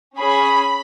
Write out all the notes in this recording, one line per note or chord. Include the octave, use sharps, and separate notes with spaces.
C#4 G#4 B5